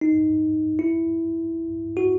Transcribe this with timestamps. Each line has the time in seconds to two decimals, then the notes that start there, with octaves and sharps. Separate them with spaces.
0.01 D#4
0.79 E4
1.97 F#4